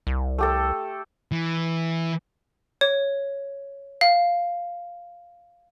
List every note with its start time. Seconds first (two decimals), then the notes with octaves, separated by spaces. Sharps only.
0.07 C2
0.38 A3 G4 A4
1.32 E3
2.81 C#5
4.01 F5